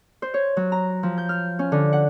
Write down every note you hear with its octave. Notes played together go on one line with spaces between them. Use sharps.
C5
C#5
F#3
A#5
F3
G6
F6
C#4
D3
F#5